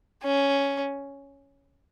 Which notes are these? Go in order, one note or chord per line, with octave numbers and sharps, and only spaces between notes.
C#4